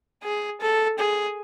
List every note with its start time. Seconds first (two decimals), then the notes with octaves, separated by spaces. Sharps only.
0.23 G#4
0.61 A4
0.99 G#4